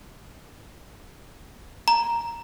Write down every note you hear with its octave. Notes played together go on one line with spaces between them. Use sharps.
A#5